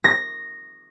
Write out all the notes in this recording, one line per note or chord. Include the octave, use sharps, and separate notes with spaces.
A#6